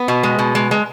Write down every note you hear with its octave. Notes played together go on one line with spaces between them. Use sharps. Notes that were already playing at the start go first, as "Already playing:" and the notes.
Already playing: B3
B2
G#3
B2
G#3
G#3